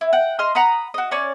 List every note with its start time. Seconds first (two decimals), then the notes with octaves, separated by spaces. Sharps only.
0.01 E4
0.13 F#5 G5
0.39 D#5 C6 F6
0.55 F#5 A#5 B5 D#6
0.94 F#4 D#5
1.11 C#4 C#5 D5